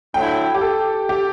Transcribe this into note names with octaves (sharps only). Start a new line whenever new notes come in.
D3 F#3 A3 E4 G5
G4
A4
G4